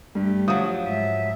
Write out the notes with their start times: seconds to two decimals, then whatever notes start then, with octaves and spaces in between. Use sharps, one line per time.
0.15 G2 A3 G4
0.48 F3 F#3 D#6
0.84 G#2 E5